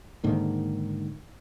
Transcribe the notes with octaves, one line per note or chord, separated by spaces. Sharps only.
G#2 D3 D#3 A#3